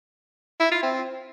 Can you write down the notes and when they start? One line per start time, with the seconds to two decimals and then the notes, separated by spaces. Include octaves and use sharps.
0.60 E4
0.71 F4
0.83 C4